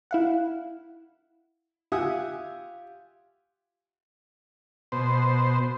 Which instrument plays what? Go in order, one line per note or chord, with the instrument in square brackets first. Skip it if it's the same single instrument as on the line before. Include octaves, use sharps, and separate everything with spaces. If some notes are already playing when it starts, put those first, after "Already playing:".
[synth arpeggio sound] E4 F5 F#5
[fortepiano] F4 G4 E5 F#5 G#5 D#6
[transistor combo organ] B2 C5